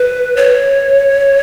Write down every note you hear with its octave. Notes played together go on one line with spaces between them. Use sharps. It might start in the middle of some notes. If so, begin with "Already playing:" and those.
Already playing: B4
C#5